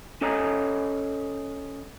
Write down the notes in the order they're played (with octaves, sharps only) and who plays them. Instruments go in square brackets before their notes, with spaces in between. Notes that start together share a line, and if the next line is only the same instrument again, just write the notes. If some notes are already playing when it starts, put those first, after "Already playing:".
[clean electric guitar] C#4 A4 C#5 D#5 G#5 A#5